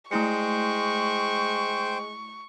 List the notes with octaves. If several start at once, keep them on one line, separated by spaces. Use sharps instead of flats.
G#3 A3 E4 C5 G5 C#6 C#7